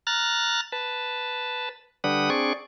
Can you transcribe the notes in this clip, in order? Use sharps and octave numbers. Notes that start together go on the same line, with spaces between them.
A#5 F6 F#6 A6
B4 A5
D3 G3 D4 B4 F#5 D#6
C4 D4 G#4 D5 C#6